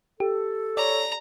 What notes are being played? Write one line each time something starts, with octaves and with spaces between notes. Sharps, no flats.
G4 A4
C#5 D5 A#5